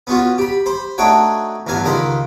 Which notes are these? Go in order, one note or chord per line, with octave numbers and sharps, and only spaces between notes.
B3 C#4 F4 F#4
G4 B5
C5 B5
A3 D4 D#4 F#4 C#5 G5
E2 G2 F#3 F5 G#5
C#2 D#3 A#4 C5 F5 B5